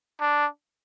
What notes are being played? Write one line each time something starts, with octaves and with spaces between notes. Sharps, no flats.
D4